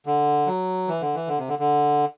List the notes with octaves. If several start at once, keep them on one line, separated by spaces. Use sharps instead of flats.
D3
F#3
E3
D3
E3
D3
C3
D3
D3